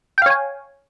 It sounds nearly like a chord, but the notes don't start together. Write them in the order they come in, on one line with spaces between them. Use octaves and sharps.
G5 F5 C#5 G#5